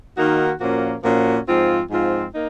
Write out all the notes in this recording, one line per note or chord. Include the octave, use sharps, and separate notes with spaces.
D#3 A#3 D#4 F#4
A#2 F3 A#3 C#4 F#4
A#2 F3 A#3 C#4 F#4
G#2 F3 C4 F4
G#2 F3 C4 F4
A#3 D#4